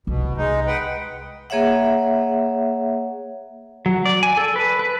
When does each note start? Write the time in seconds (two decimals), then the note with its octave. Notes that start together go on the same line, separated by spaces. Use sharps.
0.07 C2 B2
0.37 G#3 D#4
0.67 B4 F#5 G5
1.50 A#3 G#4 C#5 E5 F#5
3.86 F#3
4.05 D5
4.23 G#5
4.37 A4
4.56 B4
4.79 B4